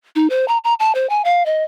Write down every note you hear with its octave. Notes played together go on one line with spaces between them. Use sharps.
D#4
C5
A#5
A#5
A5
C5
G#5
F5
D#5